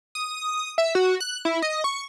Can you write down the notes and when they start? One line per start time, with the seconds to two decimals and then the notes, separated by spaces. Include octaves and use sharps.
0.15 D#6
0.78 E5
0.95 F#4
1.20 F#6
1.45 E4
1.62 D#5
1.84 C#6